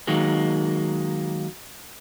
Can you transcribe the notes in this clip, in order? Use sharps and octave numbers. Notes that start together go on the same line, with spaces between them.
D#3 F#3 G#3 A#3